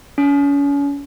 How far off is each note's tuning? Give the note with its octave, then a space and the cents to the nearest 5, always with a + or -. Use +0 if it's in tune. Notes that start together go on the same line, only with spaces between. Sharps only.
C#4 +35